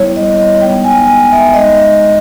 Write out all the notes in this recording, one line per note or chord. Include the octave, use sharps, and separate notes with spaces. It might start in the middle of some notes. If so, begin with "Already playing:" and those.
Already playing: G3 B3 E4 C#5
D#5
D#5
G#3 B3 D#4 G5
G#5
G#5
E5
G#3 D#4 D#5